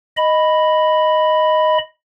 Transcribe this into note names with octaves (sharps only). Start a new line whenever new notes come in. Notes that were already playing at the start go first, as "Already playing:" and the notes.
D#5 B5